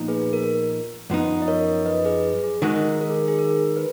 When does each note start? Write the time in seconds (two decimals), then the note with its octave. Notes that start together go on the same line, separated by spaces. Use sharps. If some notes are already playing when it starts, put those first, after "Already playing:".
Already playing: A#2 F3 B3 D#4
0.08 G#4 B4
0.33 A#4
1.10 F#2 F3 B3 D#4
1.42 D#5
1.48 A#4 C#5
1.86 B4 D#5
2.05 G#4 B4
2.43 G#4
2.62 D#3 G#3 D#4 F#4 A#4
3.01 A#4
3.10 G#4
3.28 G#4
3.39 A#4
3.77 B4